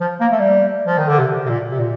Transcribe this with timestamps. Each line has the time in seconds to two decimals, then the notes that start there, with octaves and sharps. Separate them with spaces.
0.01 F3
0.20 A#3
0.32 A3
0.39 G3
0.86 F3
0.98 D#3
1.08 D3
1.19 C3
1.46 C3
1.49 A#2
1.71 C3
1.79 A#2